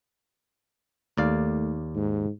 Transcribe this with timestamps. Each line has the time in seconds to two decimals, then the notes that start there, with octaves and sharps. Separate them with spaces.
1.18 D#2 A3 D5 F5
1.96 G#2